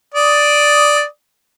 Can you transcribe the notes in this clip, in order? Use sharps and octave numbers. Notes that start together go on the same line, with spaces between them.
D5 D#6